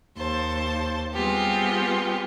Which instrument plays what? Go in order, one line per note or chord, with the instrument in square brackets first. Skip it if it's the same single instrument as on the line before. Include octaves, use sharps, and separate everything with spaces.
[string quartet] D#2 C5 A5
G3 B3 C4 F4 G4 G#4